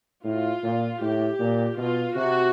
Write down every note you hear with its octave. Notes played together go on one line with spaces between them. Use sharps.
A2 F4
A#2
A2 G4
A#2
B2 F4
C3 F#4